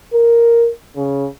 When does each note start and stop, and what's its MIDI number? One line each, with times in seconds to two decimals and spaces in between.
0.13 0.69 70
0.97 1.27 49